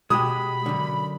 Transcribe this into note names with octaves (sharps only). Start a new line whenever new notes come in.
B2 G#3 F#4 G4 B5 D#6
F#2 D3